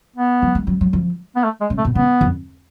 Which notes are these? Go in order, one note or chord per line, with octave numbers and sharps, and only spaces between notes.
B3
F#3
A3
F#3
F#3
F3
B3
A3
G#3
C#3
A3
B2
C#3 B3
F2